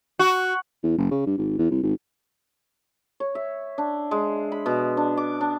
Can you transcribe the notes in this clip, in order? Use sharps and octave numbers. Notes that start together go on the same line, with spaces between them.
F#4
E2
F#1
C#3
G2
G#1
E2
C2
G#1
C#5
E5
D4
G#3
B5
B2
D4
D6
D4